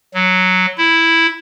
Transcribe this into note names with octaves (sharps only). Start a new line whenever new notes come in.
F#3
E4